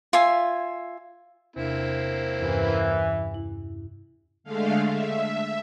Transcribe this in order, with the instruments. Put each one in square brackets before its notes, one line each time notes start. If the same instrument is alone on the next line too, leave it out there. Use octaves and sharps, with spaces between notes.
[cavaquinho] F4 E5 G#5
[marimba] E2 C3 D4 [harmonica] A#3 C4 E4
[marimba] E2 G2 C#4 [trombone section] E3
[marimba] E4
[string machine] D3 G#3 A3 F5
E5